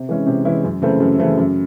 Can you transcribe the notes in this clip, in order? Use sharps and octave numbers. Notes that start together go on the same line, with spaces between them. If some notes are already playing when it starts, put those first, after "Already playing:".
Already playing: C3
E3 G#3 C#4 E4
C3
E3 G#3 C#4 E4
F#2
C#3 E3 A3 C4
F#2
C#3 E3 A3 C4
F#2